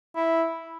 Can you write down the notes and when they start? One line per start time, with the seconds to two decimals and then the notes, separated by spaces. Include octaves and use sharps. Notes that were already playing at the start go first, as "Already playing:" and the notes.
0.16 E4